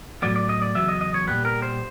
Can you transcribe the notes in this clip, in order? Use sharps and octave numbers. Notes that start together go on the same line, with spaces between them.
A2 F#3 B3 D5
D5
D#5
D5
E2 C#3 F#3 B3 E5
D#5
D#5
C#5
A#2 G3 B3 B4
A#4
C5